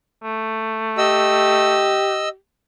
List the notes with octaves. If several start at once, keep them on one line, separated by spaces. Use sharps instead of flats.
A3
G4 D#5 E6